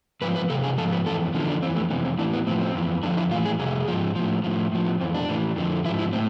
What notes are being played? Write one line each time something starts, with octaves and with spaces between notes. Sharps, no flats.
G#2 F3 B4
B4
E2 C3 A4
G#4
G#2 F3 A4
B4
F2 E3 A4
E2 D3 F3
D4
F2 E3 C4
A3
F2 C3 E3 B3
C4
A2 E3 D4
B3
A2 F3 C4
C4
F2 E3
F2 D3 F3 D4
E4
A2 E3 F4
G#4
F2 C3 G#4
G#2 F3
A2 F3
A2 F3
A2 F3
B3
F2 E3 C4
D4
A2 E3
F2 D3 F3
G#2 F3 E4
E4
A2 C4